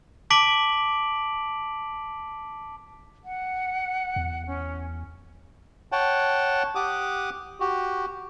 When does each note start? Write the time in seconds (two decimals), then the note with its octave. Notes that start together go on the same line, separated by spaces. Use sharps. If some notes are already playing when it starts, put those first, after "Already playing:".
0.30 A5 D6 B6 D7 F#7
3.24 F#5
4.16 E2
4.47 C#4
5.92 C#5 F#5 G5 A5
6.75 G4 F#5 D6 D#6
7.60 F#4 G4